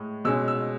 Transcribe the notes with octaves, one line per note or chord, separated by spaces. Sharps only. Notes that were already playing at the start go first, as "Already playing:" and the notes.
Already playing: A2 G#3
B2 G#3 C#4 E6
E6